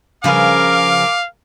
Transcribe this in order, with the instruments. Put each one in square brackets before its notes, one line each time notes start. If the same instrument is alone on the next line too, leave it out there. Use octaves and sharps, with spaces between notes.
[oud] C#3 F3 B4 [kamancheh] A#4 G#5 [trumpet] F5 [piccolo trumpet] D6